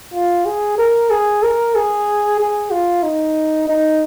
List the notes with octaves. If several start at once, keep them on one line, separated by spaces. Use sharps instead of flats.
F4
G#4
A#4
G#4
A#4
G#4
G#4
F4
D#4
D#4